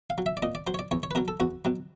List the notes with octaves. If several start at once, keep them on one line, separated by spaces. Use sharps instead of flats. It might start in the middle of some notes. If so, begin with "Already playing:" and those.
F5
F#3
E5
D5
A#2 D#5
D5
F#3 C5
C#5
D5
E2 C#5
C#5
B4
B2 F#3 A#4
A4
E2 F#4
B2 F#3